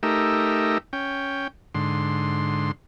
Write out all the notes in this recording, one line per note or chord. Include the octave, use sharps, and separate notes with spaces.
A3 D#4 G4 A#4 E5
C#4 G5
G#2 D3 C6